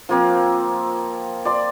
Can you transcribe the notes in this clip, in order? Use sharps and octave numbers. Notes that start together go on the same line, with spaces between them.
F3 A#3 C4
D5 C6 D6